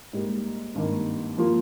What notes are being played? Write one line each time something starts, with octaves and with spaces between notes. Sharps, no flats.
G#2 G3 A#3
G#1 G2 D#3 A#3
F3 A#3 F4